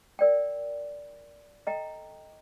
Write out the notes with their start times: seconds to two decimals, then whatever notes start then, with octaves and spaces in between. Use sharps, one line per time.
0.19 A#4 D5 G5
1.67 A4 D#5 G5 A#5